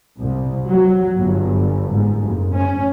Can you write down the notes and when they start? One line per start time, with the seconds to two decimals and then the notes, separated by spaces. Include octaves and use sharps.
0.19 C2
0.68 F#3
1.18 G1
1.92 G#2
2.23 F#1
2.56 C#4